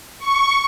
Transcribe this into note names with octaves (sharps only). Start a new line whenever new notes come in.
C#6